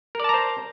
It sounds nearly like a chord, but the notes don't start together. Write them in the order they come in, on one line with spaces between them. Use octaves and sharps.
A#4 D5 A5 A#5 C5